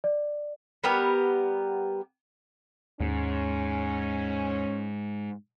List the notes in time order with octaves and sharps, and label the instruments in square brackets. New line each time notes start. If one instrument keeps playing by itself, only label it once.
[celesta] D5
[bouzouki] G3 B3 G4 A#4
[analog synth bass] D#2 [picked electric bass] G#2 [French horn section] C#4